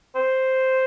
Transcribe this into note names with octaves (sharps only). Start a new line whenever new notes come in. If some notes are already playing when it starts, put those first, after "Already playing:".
C5